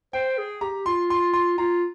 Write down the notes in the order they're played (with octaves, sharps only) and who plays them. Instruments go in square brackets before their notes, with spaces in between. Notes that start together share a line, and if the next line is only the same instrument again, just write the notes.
[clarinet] C5 [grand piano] G5
[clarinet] G#4
[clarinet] G4 [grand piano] A#5
[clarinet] F4 [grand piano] C6
[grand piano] C6
C6
[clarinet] F4 [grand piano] A#5